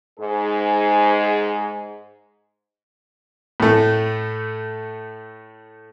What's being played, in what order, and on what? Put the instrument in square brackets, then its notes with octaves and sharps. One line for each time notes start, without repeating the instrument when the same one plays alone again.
[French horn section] G#2 G#4
[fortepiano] A2 A3